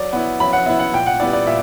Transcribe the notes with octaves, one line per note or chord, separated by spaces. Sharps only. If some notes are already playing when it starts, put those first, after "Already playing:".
Already playing: F#3 D5
B3 E4
F#3 B5
F#5
B3 E4 E5
F#5
A#2 G5
F#5
G3 B3 E4 D5
D5
A#2 E5